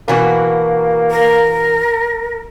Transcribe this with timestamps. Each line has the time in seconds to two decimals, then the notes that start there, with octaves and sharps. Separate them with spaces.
0.08 B2 E3 A#3 F#4
1.11 A#4